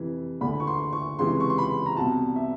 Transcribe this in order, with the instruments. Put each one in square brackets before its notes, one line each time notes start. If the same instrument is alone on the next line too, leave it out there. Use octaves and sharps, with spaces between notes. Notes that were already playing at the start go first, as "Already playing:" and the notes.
Already playing: [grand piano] F2 C3 E3
D2 D3 B5
C#6
C6
C#6
C#2 C3 E3 C6
C#6
C6
B5
A#5
C2 B2 A5
E5